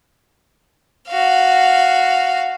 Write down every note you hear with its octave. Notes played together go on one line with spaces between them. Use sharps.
F#4 F5